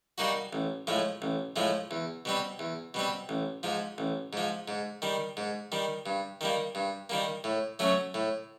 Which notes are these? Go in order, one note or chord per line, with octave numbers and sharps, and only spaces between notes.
G3 A#3 D#4 F#4
A1
A2 F3 G#3
A1
A2 F3 G#3
E2
B2 G3 C4
E2
B2 G3 C4
A1
G#2 F3
A1
G#2 F3
G#2
D#3 G3
G#2
D#3 G3
G2
D#3 G3 A#3
G2
D#3 G3 A#3
A2
F#3 A3 C#4
A2